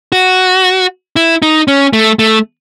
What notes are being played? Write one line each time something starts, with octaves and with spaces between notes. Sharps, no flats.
F#4
E4
D#4
C#4
A3
A3